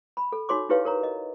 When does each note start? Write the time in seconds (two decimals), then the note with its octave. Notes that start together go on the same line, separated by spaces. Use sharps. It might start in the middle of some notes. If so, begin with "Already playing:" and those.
0.17 B5
0.32 A4
0.49 D#4 F#4 C#5 C6 D6
0.69 D#4 E4 G4 B4 C#5 F5
0.85 A#4 C#5 A#5
1.03 D#5